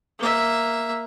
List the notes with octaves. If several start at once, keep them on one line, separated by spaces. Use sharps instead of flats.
A#3 E5